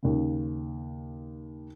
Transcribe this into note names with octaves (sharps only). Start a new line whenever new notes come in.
D#2 C#3